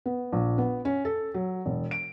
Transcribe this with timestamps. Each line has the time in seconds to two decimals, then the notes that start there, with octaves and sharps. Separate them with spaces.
0.06 B3
0.33 A#1
0.58 B3
0.85 C#4
1.05 A4
1.34 F#3
1.66 E1
1.91 D7